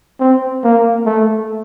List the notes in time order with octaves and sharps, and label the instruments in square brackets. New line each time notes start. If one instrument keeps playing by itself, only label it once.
[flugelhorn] C4
A#3
A3